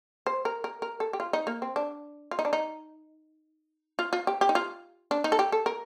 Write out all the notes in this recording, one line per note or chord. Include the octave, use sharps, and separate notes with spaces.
C5
A#4
A#4
A#4
A4
G4
F4
D#4
A#3
C4
D4
F4
D#4
D4
D#4
F4
F4
G4
G4
D#4
F4
D4
D#4
A4
G4
A4
A#4